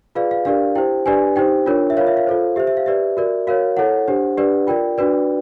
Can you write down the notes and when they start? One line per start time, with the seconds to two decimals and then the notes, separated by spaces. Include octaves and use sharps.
0.15 F4 G#4 B4 D5 F5
0.31 F5
0.45 D4 G4 A#4 D5 F5
0.75 E4 G4 C5 G5
1.06 D4 G4 B4 D5 G#5
1.36 D#4 G4 C5 G5
1.66 D4 F4 A#4 C#5
1.90 E5
1.97 F4 A#4 C#5 F5
2.07 E5
2.17 F5
2.27 F4 A4 C5
2.56 G4 E5
2.60 C5
2.67 E5
2.77 F5
2.86 G4 B4 D5 E5
3.17 F#4 A#4 D5
3.47 F#4 A#4 C#5 F5
3.77 E4 A4 C#5 F#5
4.08 D4 G4 C5
4.38 D4 G4 B4 D5
4.67 F4 A#4 D5 G5
4.98 D4 F#4 B4 D5